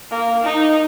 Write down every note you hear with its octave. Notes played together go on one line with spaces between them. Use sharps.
A#3
D#4